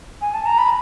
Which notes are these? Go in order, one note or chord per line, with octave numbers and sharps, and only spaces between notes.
G#5
A5
A#5
B5